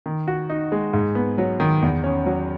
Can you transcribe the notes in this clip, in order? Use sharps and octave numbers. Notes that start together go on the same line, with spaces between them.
D#3
F#4
D#4
G#3
G#2
B3
F#3
D#3
E2
C#4
F#3